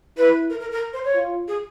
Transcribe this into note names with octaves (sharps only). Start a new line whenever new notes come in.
E4 B4
A#4
A#4
A#4
C5
C#5
F4
G#4